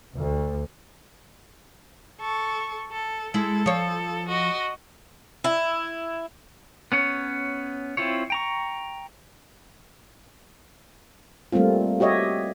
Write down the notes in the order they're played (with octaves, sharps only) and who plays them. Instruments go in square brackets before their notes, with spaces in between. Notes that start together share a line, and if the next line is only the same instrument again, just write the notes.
[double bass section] D2
[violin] A4 C#6
A4
[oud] G#3 E4 [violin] A4
[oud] F3 C#5
[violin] F#4 D#5
[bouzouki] E4
[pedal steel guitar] B3 C#4 C#5
C4 E4 F4 C#5
G5 A#5 C#6
[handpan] G3 A3 A#3 C4 F4
F#4 G4 C#5 D#5 E5